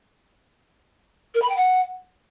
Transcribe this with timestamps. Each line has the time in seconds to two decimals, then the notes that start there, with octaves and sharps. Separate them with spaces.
1.34 A#4
1.41 B5
1.49 G5
1.56 F#5